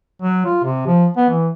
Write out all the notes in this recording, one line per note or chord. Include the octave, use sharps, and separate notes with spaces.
F#3
F4
C3
F3
B3
E3